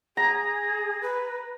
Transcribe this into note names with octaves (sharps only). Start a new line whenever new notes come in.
G#4 A#5
B4